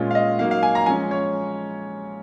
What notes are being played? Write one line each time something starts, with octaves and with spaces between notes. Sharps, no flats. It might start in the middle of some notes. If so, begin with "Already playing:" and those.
Already playing: A#2 G#3 C#4 F4
F5
D#5
F#3 A#3 D#4 F5
F5
G#5
A#5
F3 G#3 C#4 G#5
C#5